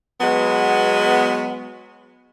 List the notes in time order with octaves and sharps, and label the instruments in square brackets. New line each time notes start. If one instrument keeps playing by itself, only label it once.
[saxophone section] F#3 G#3 B3